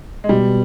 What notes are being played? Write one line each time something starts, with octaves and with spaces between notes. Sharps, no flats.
G#3
B2 G3